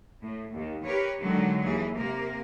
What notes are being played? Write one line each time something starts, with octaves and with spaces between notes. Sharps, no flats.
A2
D#2 D#3
G4 A#4 B4 C#5
D3 D#3 F#3 G#3
D#2 E3 G#4
C3 A#3 A#4